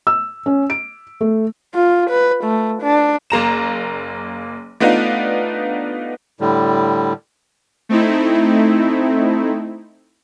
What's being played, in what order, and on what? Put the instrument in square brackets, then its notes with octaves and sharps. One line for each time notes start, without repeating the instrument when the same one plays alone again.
[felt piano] E6
C#4
D7
A3
[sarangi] F4
B4
A3
D4
[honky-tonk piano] F#1 A#3 A#5 E7
A3 B3 D4 D#4 F4
[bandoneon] A2 D3 G3
[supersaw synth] A3 C4 D#4 E4